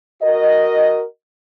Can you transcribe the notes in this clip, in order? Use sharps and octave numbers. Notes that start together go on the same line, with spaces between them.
F#4 A#4 D#5